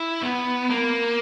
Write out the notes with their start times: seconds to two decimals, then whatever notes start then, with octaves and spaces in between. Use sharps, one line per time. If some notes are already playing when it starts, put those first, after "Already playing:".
Already playing: E4
0.22 B3
0.70 A#3